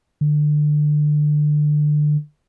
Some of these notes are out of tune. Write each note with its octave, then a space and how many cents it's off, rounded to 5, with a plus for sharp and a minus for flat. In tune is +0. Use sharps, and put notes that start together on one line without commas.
D3 +25